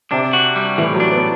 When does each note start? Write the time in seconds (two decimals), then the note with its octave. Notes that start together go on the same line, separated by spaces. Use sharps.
0.11 C3 D4
0.33 F#4
0.56 G3
0.78 A2 E3
0.94 F#3
1.00 D4
1.11 B3